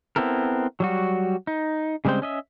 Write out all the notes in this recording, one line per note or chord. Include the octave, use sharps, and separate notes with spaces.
B3 C4 E4 A4 A#4
F#3 G3 F#4
D#4
C#3 G3 G#3 C4 C5
C#4 D#5 E5